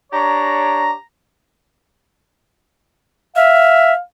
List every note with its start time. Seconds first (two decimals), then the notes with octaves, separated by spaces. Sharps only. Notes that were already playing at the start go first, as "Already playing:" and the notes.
0.12 D4 G4 C#5 A#5
3.36 E5 F5